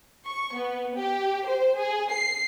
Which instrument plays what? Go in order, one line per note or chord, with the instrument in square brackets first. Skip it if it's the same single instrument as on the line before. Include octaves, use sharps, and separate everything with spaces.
[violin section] C#6
B3
G4
C5
G#4
C7